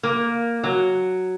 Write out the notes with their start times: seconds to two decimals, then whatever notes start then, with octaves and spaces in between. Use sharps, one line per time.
0.03 A#3
0.63 F#3